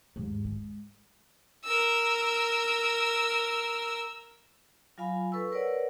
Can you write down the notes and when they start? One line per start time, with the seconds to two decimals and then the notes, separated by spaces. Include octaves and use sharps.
0.16 D#2 G#2
0.45 G#3
1.64 A#4 E6
4.98 F#3 F4 F5 G#5 B5
5.32 A4 B4 C#6 E6
5.52 A#4 B4 C#5 D5 F#5